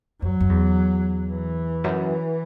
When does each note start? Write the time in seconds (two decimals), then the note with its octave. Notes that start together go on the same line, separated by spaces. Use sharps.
0.22 F#2 F#3
0.41 F#2
0.49 E2
1.30 E3
1.84 F#2